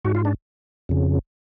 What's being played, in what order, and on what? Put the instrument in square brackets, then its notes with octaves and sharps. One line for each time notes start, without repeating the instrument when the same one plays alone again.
[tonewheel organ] G#2 F#4
F4
D4
F2 C#3